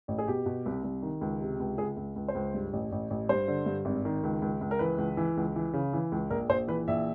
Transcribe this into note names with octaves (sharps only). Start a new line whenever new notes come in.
A1
G#4
B2 G4
B2
C2
C2
D#3
C#2
C3
C#2
C#2 G#4
C#2
C#2
C5
C#2
G2
A1
A1
A1
G2 C5
D3
G2
G#1
D#3
C#2
C#2
C#2
A#4
E3 B4
C#2
E3
C#2
E3
C#3
E3
C#2
A#1 A#4
A#1 C5
E3 B4
A#1 E5